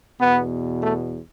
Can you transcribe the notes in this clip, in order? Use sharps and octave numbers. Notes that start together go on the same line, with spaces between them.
E2 B2 B3
A3